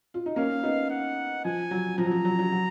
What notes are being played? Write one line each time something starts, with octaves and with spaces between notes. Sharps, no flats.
F4
D#4
A#3 C#4 F5
B3 D#4
F#5
F3 G#5
F#3
F3 A#5
F#3
F3
F#3
F#3
F#3